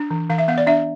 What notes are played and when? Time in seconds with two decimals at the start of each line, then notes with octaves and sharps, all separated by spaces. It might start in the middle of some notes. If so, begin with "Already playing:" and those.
Already playing: D4
0.10 E3
0.30 E3 F5
0.38 E5
0.48 B3 F5
0.58 D5
0.67 D4 E5